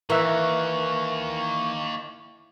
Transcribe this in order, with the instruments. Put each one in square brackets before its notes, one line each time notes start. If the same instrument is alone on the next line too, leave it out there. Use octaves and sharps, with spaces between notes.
[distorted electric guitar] D#3 A#3 [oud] E3 [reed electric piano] A#4 E5 F#6 [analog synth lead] C#6